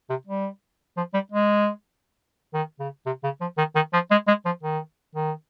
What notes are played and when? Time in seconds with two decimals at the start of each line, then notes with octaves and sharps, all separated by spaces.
0.09 C3
0.27 G3
0.97 F3
1.14 G3
1.31 G#3
2.54 D#3
2.80 C#3
3.06 C3
3.24 C#3
3.41 F3
3.58 D#3
3.75 D#3
3.93 F3
4.11 G#3
4.27 G#3
4.45 F3
4.63 D#3
5.15 D#3